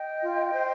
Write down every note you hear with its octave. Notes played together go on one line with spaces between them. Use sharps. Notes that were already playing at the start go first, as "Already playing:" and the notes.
Already playing: D#5 G5
F4
C5